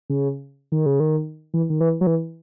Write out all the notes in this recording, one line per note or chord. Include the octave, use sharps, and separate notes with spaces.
C#3
D#3
C#3
D#3
E3
D#3
E3
F#3
E3